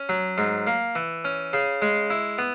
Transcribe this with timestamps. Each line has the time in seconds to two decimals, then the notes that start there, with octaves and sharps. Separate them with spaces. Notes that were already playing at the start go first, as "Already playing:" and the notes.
Already playing: C#4
0.09 F#3
0.38 G#2
0.67 A#3
0.95 E3
1.25 C#4
1.53 C#3
1.82 G#3
2.10 E4
2.38 B3